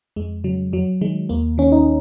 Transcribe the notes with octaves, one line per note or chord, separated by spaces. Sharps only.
F2 G#3
C#3 F#3
F2 F#3
D#3 G#3
D#2 A#3
D#3 C#4
D#4